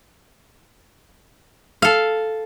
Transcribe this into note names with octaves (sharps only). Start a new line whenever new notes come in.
A4 F5